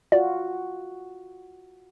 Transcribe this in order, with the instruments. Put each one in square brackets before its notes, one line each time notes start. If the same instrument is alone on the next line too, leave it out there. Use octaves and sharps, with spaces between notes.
[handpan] F4 F#4 [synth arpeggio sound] D5